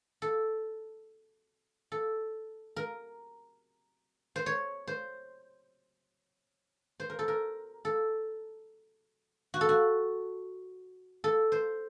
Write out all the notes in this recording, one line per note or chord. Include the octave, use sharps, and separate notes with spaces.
A4
A4
A#4
C5
C#5
C5
C5
A#4
A4
A#4
A4
F#4
A4
F#4
A4
C5